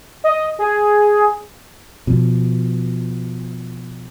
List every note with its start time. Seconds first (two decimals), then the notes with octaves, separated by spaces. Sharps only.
0.24 D#5
0.59 G#4
2.07 B2 F3